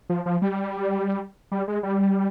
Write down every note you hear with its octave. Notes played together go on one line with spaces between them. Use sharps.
F3
F3
G3
G3
G#3
G3